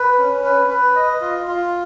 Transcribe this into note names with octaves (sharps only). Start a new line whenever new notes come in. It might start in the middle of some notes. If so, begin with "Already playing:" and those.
Already playing: B4
C#4
B4
B4
D#5
F4
F4